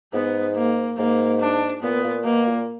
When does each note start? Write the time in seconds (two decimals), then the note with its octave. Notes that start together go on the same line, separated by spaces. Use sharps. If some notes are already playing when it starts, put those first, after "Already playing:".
0.13 G#2 B3
0.56 A#3
0.98 G#2 A#3
1.40 D4
1.82 A#2 B3
2.04 A#2
2.25 B2 A#3
2.47 A#2